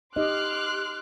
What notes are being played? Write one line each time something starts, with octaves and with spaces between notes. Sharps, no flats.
D#4 G4 D#5 C6 D6 F6 F#6